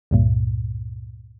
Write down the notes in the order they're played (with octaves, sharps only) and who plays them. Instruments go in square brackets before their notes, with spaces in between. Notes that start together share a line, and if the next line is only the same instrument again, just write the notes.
[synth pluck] C#2 G2 A#2